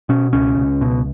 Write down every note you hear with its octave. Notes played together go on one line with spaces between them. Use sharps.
B2 C#4
C#2 C#4
C#2
B2